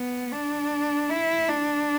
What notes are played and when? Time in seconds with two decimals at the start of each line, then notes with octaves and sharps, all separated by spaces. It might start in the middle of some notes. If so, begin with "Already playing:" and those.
Already playing: B3
0.32 D4
1.10 E4
1.49 D4